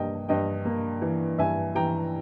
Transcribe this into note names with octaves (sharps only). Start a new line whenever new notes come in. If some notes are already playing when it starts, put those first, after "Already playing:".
Already playing: G2 A#3 D#5 G5
G2 D#5 G5
A#3
E3
G2 E5 G#5
E3 G5 A#5